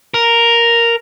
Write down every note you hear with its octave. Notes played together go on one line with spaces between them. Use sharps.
A#4